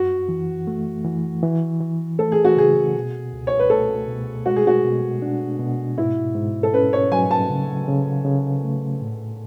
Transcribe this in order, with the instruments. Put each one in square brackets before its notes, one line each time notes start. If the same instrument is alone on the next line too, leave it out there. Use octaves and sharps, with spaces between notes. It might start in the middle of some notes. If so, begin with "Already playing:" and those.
Already playing: [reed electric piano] F#2 [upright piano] F#4
[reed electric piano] E3
A3
E3
E3
E3
[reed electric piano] A3 [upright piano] A4
[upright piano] G#4
F#4
[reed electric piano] C#3 [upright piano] G#4
[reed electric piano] B2
C#2
[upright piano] C#5
B4
[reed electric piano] A3 [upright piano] A4
[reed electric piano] B2
[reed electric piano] G#3 [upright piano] F#4
[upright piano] G#4
F#4
[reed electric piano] B2
D4
B2
[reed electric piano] G#2 [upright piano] E4
[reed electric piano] G#2
[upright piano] A4
[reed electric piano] C#4 [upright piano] B4
[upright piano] C#5
[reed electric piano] F#3 [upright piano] G#5
[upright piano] A5
[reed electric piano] C#3
C#3
C#3
A3
A2